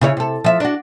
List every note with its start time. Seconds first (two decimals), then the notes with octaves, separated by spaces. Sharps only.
0.01 C#3 E4 C#5
0.17 C3 A4
0.44 F3 E5
0.60 D4 F#4